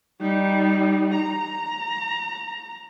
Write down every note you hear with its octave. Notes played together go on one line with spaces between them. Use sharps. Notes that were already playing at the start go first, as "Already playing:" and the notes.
G3 D#4
A#5